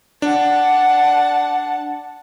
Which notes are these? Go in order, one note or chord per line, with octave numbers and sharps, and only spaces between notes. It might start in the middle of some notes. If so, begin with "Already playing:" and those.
D4 F#5 A5